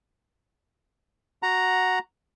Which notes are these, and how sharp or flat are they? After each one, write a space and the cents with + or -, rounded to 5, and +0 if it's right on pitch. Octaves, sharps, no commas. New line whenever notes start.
F#4 -5 F#5 -5 A#5 +0